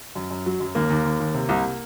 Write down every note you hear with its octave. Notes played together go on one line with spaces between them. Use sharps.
F#2
F#2
F#3
F#2
D#2 A#3
D#2
D#2
D#2
C3
C2